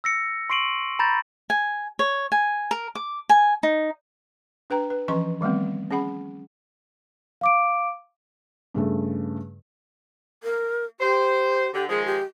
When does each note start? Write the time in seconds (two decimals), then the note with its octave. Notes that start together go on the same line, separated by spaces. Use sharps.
0.04 E6 A#6 C#7
0.50 C6 C#6 C7 D7 D#7 F#7
0.99 A#5 B5 G6 A6 A#6
1.50 G#5
1.99 C#5
2.32 G#5
2.71 A#4
2.95 D6
3.29 G#5
3.63 D#4
4.70 D4 B4 G5 A#5
4.90 B4
5.08 E3 F3 C#4 D#5 C6 C#6
5.41 D#3 G3 A3 B3 C4
5.91 C#4 G#4 F#5 B5
7.41 F5 D6 D7
8.74 G2 C#3 A3
10.43 A#4
11.00 G4 C5
11.74 D3 G4
11.89 D#3 F3 G#3 G#4
12.05 G4